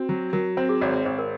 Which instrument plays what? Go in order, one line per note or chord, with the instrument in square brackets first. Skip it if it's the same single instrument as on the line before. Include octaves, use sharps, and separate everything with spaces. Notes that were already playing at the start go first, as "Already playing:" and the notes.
Already playing: [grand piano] C4 [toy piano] F#4
[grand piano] F#3
[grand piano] F#3 [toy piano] A#4
[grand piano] C4 [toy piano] C5
[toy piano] G#4
[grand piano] G#1 [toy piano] C#5
[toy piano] C#5
[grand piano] G#1 [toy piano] C5
[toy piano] A#4